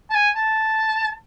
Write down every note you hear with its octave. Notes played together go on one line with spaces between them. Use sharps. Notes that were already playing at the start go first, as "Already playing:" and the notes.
A5
G#5
A5